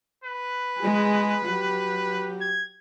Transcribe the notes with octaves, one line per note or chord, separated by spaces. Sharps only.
B4
G#3 G#4
F#3 G4
G#6